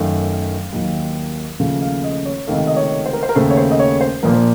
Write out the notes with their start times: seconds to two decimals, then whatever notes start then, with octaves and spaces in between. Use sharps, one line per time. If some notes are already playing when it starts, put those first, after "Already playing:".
Already playing: F#2 D#3 A3 F5
0.72 D#2 D#3 F#3
1.59 D#2 C#3 F3 A3 F5
1.82 F5
2.04 D#5
2.25 C#5
2.47 C#2 C3 D#3 A3 F5
2.67 D#5
2.76 C#5
3.06 C5
3.13 A#4
3.23 C5
3.29 A#4
3.35 D#2 C#3 A3 C5
3.50 C#5
3.57 C5
3.71 D#5
3.79 C#5
4.01 C5
4.23 A#1 A#2 F3 A#3 A#4
4.33 C5